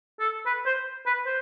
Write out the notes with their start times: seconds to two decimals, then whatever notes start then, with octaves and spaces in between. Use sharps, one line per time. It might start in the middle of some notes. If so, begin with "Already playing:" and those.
0.20 A4
0.46 B4
0.66 C5
1.06 B4
1.26 C5